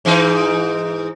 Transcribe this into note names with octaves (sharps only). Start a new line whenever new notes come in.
G#2 E3 D#4